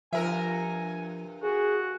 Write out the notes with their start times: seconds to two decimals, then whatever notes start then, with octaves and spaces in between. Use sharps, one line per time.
0.13 G2 F3 A#4 E5 G#5
1.43 F#4 G#4